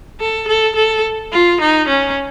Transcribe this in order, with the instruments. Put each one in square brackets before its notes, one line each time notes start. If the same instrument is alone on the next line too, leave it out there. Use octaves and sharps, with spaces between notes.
[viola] A4
A4
A4
F4
D#4
C#4